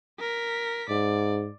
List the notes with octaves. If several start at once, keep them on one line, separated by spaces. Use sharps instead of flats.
A#4 B6
G#2 D5